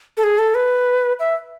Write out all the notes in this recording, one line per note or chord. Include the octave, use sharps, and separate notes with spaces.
A4
G#4
A4
B4
E5